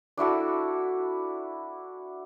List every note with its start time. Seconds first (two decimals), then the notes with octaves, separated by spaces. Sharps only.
0.17 D4 E4 F#4 A4